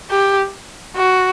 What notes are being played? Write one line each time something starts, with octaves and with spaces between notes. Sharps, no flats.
G4
F#4